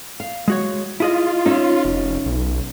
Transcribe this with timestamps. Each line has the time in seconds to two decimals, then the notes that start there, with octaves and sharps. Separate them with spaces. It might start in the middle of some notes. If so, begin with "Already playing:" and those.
0.20 F5
0.48 G#3 F#4 C#5
1.00 E4 F4 G#4 D#5
1.46 C#4 D#4 C#5 E5
1.85 F1
2.26 B1